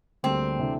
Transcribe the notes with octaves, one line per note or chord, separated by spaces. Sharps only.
D2 D3 G3 A#3 C4 D4
C3 E3 A3 D4